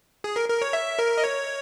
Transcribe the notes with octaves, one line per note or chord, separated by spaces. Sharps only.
G#4
A#4
A#4
C#5
E5
A#4
D#5
C#5